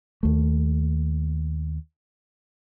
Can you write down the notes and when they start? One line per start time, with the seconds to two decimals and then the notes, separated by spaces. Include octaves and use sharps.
0.23 D#2 A3